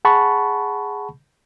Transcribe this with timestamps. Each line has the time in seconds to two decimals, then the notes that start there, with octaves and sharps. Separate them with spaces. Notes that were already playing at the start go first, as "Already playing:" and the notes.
0.05 G#4 F#5 A5 B5 C#6